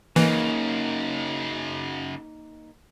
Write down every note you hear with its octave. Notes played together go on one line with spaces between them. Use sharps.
F#2 C#3 E3 A#3 D#4 A#4